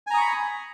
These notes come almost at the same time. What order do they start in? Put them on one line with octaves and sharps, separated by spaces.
G#5 A#5 D#6 C#6 B5